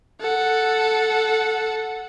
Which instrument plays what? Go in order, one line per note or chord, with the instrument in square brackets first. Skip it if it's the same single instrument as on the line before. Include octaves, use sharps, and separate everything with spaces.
[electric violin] A4 F#5